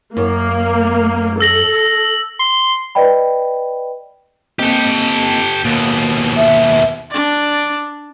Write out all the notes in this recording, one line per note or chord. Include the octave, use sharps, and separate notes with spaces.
F#2 A#3
A4 E6 A#6 F#7
C6
B4 D5 D#5 G5 B5
A#3 C4 G4 A4 D#5
D#2 B2 A#3
E5
D4 D5